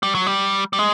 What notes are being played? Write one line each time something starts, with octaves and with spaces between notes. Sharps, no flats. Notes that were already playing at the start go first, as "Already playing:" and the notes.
G3
F#3
G3
G3
G#3